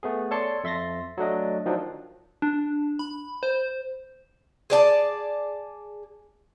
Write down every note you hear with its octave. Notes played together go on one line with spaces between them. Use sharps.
A3 B3 G#4
A4 C#5 D5 A5 C6 C#7
F2 E5 C6 A6 A#6
F#3 A3 D4 D#5
D#3 F3 F#3 D4
D4
B5
C5
G#4 D5 A5